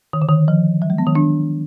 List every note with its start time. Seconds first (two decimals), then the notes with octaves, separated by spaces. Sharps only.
0.13 D#3
0.22 D3
0.29 D#3
0.48 F3
0.82 F#3
0.90 G#3
0.98 B3
1.07 D#3
1.15 D4